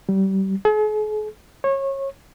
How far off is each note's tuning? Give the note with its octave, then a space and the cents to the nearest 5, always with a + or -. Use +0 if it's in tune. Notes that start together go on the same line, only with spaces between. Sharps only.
G3 -30
G#4 +45
C#5 -25